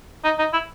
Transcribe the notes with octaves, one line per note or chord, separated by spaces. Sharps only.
D#4
D#4
E4